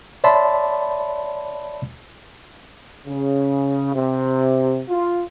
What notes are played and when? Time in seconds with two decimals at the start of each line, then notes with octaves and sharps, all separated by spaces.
0.24 C#5 D5 E5 A5 B5 C6
3.07 C#3
3.94 C3
4.89 F4